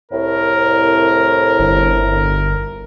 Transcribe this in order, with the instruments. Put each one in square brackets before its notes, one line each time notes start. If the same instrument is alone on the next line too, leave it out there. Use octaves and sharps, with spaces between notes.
[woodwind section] C2 A2 [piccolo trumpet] A#4
[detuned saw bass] G1